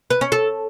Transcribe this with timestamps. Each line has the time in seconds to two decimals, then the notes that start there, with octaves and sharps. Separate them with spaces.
0.10 B4
0.21 C#4
0.32 A4